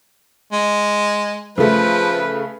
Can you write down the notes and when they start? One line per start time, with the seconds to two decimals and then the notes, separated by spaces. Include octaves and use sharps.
0.52 G#3
1.58 C#3 F3 A3 B4